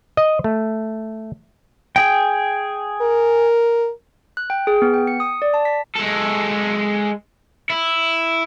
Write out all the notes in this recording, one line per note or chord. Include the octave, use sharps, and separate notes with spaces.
D#5
A3
G#4 G5
A#4
F#6
G5
G#4
B3
G5
C#7
D#6
D5
A5
B6
G#3 A4
E4